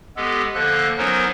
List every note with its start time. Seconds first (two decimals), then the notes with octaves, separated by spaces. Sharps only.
0.17 G#3 B3 G4 A4
0.55 D3 F3 A#3 A4 F#6
0.98 F#3 B3 C#4 D#4 A#4 C5